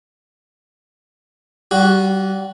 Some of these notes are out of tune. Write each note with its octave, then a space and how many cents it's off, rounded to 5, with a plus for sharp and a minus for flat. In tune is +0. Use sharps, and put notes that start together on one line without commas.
G3 -30 F#4 +0